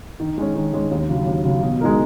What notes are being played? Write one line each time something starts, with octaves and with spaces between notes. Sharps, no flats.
D#3
G#3 C#4
D#3
G#3 C#4
D#2
C#3 F#3
D#2
C#3 F#3
B2
G#3 D#4 A#4